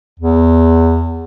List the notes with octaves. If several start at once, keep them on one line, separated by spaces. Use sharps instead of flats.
E2